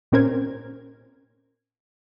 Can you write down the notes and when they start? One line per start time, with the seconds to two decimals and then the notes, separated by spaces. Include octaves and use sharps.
0.12 A#2 C4 C#4 A#4 C5 G#6